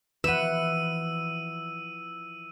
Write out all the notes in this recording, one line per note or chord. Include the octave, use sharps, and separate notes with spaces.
E3 F3 B4 E5 F#5 E6 D#7